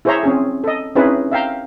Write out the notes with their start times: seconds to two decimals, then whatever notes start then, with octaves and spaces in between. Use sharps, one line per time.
0.05 E4 G#4 C5 C#5 E5 A#5
0.23 C4 C#4 G#4
0.64 A4 D#5
0.95 C4 C#4 D#4 E4 G#4 B4
1.32 E5 F5 G5 A#5